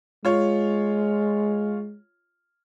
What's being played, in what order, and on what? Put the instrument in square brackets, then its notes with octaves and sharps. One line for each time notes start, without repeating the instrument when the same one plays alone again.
[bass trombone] G#3 [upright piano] F4 C#5